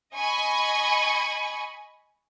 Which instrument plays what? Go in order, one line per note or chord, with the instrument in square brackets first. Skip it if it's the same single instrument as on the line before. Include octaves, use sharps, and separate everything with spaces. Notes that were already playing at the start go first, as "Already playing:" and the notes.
[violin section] D#5 G#5 B5 C#6